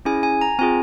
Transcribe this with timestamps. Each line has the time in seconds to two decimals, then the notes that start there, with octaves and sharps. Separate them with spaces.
0.05 C#4 E4 G#4 G#5
0.23 G#5
0.41 A#5
0.59 C4 F4 G#4 G#5